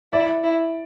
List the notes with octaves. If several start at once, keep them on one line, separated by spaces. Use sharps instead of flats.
E4 D5
E4